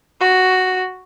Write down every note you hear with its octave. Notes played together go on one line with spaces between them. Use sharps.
F#4